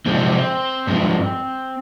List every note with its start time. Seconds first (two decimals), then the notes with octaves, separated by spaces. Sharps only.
0.06 C3 F3 G#3 C4
0.87 G2 F3 G#3